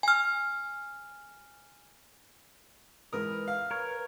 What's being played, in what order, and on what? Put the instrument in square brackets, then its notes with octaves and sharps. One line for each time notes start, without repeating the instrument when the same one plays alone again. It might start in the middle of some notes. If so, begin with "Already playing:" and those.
[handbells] G#5 F6
[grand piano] G#2 E3 D#6 [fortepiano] A#4 [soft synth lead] B4
[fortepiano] F5 [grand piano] F6
[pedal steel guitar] A#4 C#5